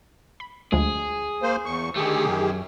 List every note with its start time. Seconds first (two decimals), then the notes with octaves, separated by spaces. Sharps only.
0.40 B5
0.72 D2 F3 G#3 G#4
1.42 A#3 C5
1.66 E2 C#6
1.96 D3 D#3 A3 G4 G#4
2.24 B1 F#2